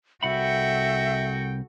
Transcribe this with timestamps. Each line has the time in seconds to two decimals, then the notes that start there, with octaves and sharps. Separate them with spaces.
0.23 C2 F#4 A4 E5 F#5 G5 B5